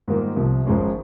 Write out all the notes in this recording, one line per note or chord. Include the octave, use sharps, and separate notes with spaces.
G#2 D#3 G3 A#3 F4
C2 C3 F3
G#1 G#2 F3 G#3 C#4